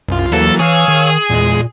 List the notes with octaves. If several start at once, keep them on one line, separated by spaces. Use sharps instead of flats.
C2 F#2 F4
D#2 E3 F#3 A#3 A4
E3 G#4 C#5 F5 E6
D#3
E2 A#2 G#3